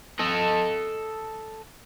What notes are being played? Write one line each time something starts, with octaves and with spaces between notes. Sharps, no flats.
A4 D#5